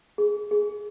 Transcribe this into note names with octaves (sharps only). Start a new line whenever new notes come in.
G#4
G#4